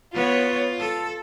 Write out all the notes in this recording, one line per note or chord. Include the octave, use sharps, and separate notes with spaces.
B3 F4 C#5
A4